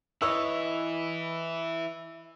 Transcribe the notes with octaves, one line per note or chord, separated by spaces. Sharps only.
E3 E4 B4 C#5 D#5 E6